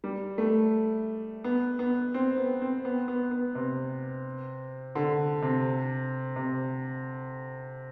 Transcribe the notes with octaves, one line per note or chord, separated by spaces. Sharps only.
G3
A3
B3
B3
C4
B3
C4
B3
B3
B3
C3
D3
C3
C3